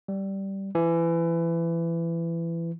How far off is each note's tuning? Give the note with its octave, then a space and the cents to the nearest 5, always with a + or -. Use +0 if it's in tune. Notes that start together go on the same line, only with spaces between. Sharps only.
G3 -10
E3 +25